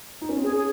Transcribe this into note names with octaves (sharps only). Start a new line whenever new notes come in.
D#4
C#4
C4
C#4 G#4
G#4